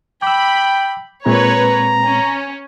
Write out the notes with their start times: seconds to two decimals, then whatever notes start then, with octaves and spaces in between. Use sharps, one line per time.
0.22 G5 B5 D6 E6
1.26 A#2 G#3 C4 B4 C#5 A#5
2.04 C#4